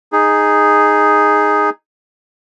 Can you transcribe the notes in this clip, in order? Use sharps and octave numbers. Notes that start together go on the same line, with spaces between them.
D#4 G#4